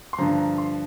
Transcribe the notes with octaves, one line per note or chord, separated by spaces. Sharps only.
C6
G2 D3 F3 A#5
A#5
C6